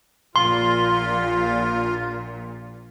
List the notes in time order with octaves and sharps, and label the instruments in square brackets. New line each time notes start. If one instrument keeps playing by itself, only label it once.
[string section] A#1 A#2 [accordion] F4 [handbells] C6